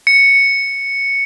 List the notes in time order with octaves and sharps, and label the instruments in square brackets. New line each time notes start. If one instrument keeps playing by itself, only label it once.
[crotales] C#7